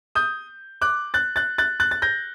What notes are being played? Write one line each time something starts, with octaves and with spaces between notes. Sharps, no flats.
D#6 G6
D6 F#6
F#6 A6
F#6 A6
F#6 A6
F#6 A6
A6
G6 A#6